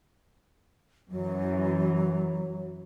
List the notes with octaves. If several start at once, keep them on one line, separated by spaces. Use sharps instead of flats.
F#2 E3 F#3